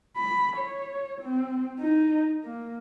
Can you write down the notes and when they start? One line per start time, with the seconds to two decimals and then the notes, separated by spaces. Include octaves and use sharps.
0.17 B5
0.56 C#5
1.21 C4
1.80 D#4
2.44 A#3